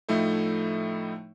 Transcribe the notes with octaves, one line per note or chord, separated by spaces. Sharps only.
A2 F3 A3 D#4 E4